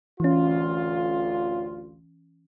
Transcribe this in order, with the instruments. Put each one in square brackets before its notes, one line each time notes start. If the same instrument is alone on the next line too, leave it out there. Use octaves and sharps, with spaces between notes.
[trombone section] A1 D2 F4 [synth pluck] E3 C#4